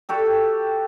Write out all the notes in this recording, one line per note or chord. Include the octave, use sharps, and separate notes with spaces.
F#4 G4 A4